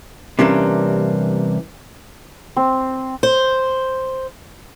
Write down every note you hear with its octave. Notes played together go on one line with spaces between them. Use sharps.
C3 E3 G3 A#3 C#4 D4
C4
C5